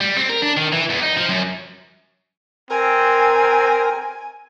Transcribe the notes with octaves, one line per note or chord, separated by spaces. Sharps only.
G3
C4
A#4
D4
D#3
E3
E2
D#4
F3
F#2
C4 A#4 G#5